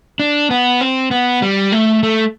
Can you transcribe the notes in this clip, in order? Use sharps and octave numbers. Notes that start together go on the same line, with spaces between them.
D4
B3
C4
B3
G3
A3
A3